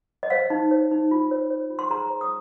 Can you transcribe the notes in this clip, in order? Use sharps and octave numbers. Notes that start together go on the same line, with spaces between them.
D#5
C5 F5
D#4
C5
D#4
F4
C5
C5
F4
C6
G#4 A#5
C5
D#6